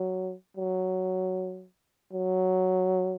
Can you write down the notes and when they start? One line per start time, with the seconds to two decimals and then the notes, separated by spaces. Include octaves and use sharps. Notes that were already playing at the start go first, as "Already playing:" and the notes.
Already playing: F#3
0.57 F#3
2.13 F#3